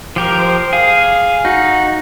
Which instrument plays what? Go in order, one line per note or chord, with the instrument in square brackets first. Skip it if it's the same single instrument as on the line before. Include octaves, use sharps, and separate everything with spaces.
[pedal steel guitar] F3 G4 A#4
[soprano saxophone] C5
[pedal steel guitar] G#4 [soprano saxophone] F5
[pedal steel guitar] D#4 [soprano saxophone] F#4